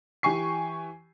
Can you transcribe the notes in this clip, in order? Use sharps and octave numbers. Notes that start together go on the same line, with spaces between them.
E3 G4 G#5 C#6 C7